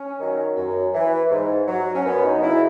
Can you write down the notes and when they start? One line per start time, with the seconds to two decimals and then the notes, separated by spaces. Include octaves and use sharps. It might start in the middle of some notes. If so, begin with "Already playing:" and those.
Already playing: C#4
0.19 D#3 F#3
0.57 F#2
0.94 E3
1.31 G#2
1.68 F#3
1.95 C#4
2.05 F#2 B3
2.24 D#4
2.42 C#3 F#3 E4